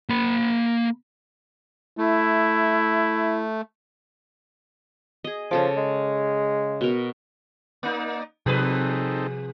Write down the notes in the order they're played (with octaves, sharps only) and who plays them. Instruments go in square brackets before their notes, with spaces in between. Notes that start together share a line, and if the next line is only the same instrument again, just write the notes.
[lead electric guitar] A#3 B5
[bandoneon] A3 [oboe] E4
[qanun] G#4 D#5
[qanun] C#3 A4 D6 [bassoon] F3
[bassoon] G#3
[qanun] B2 A#4
[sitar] A#3 D#4 [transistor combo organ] D5
[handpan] C3 [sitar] F3 G#4 B4 [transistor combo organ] C4 D#4 A4